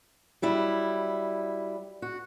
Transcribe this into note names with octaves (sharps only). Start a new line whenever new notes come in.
F#3 G3 E4
F#4